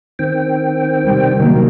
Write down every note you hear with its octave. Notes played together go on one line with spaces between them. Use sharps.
D#3 C4 G5
C3 G3
D#3 F#3 A#3